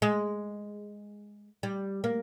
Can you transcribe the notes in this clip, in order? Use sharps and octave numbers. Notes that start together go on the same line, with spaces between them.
G#3
G3
A#3